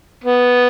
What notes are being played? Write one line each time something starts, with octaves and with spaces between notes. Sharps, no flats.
B3